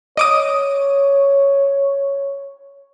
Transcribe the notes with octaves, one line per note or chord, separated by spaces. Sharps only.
C#5 D#5 D6 D#6